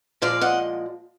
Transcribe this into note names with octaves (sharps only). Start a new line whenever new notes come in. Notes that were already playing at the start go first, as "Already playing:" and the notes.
A#2 F3 G#3 D5 F5
D#5 F#5